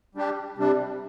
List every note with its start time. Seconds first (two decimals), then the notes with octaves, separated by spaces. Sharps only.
0.15 G3 D4 G4
0.57 C3 G3 D4